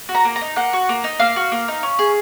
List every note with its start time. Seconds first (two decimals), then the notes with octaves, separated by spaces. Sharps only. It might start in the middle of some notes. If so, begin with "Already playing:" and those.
0.09 F#4
0.15 A#5
0.25 A#3
0.36 A#5
0.41 D#4
0.56 A#3 F#5
0.73 F#4
0.89 A#3
1.04 D#4
1.20 A#3 F5
1.36 F#4
1.52 A#3
1.68 D#4
1.83 C#4
1.99 G#4